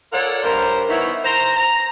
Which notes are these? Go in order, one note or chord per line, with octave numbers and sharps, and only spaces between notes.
F4 A4 A#4 C#5 D5 F#5
G2 A#4 C5
E3 B3 D#4 E4 C#5
C5 A#5
A#5